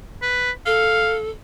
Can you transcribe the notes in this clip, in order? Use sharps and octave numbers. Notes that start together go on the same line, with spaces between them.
B4
A4 F5